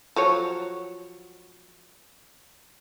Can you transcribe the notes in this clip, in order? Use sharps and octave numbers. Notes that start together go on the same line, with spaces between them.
F3 F#3 C#5